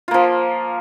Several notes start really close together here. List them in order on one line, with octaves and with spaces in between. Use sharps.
F4 A#3 F3